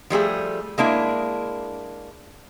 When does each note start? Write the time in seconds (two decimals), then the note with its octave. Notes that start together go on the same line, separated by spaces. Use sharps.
0.10 F3 G3 A3 G#4
0.78 G#3 A#3 D4 E4